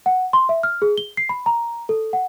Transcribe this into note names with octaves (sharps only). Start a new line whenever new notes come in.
F#5
C6
E5
F6
G#4
G7
C7
B5
A#5
A4
F#5